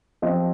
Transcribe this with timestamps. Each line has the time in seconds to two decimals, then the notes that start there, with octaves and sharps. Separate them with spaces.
0.22 F3 C4 G4 C5 D#5